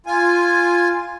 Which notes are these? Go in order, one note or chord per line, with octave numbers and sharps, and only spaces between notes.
F4 G#5